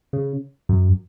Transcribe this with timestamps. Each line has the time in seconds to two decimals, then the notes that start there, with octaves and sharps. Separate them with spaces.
0.13 C#3
0.69 F#2